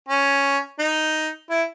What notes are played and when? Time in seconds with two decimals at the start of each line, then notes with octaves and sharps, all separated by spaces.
0.08 C#4
0.79 D#4
1.50 E4